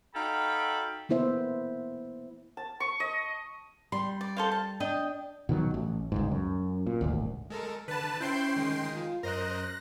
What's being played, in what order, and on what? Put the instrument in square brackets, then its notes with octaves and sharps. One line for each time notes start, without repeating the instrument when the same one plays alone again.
[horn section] D#4 F#4 A4 F5 G5 B5
[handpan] A#3 B3 E4 C5 E5
[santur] A5
C#6
D#5
[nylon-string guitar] G3 [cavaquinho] C6
[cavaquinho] D5
A4 C5 F5
A5
[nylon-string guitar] D4 [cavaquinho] D#5 G5
[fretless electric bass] B2 D#3 E3 F#3
A1
G1 C#2 G#2
F#2
A#2
D#1 G#1 D2
[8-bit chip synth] G#3 A4 A#4
[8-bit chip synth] D3 [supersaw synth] B4 A5
[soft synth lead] C#4 [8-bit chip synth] E4 C5 G6 [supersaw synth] G5 C6 C7
[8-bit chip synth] D#3 G#3
[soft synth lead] F4
[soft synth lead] F#2 [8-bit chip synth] A#4 C5 D#5 [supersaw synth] F#6 A#6